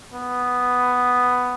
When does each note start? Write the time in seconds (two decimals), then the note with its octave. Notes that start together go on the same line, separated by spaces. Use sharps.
0.13 B3